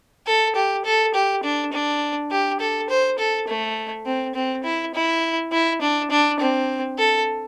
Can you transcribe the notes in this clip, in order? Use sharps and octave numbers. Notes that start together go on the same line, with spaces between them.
A4
G4
A4
G4
D4
D4
G4
A4
C5
A4
A3
C4
C4
E4
E4
E4
D4
D4
C4
A4